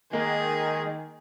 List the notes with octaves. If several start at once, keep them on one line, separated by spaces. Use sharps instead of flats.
D#3 G#3 A#3 G#4